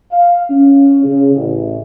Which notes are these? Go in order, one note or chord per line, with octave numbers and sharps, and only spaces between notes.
F5
C#4
C#3
A1